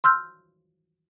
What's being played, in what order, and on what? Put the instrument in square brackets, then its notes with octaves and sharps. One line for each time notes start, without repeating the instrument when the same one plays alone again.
[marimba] C6 E6 F6 G6